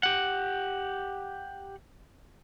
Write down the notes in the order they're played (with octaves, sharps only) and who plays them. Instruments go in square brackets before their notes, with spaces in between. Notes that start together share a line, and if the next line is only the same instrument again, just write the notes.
[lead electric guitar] G4 F#5